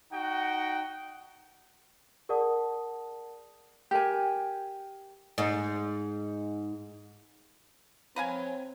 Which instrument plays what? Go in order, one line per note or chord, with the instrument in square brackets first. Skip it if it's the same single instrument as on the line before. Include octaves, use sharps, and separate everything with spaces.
[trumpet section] D#4 F#4 F#5 G5
[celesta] G#4 A#4 D5 F#5 A5 D#6
[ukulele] G4 A#4 G#5
[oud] G#2
[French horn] C4 [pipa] B4 F5 G#5 [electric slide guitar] C#5 A#5